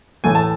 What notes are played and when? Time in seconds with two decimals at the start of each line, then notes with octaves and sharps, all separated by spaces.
0.24 A2 E3 A3 G#5
0.35 A5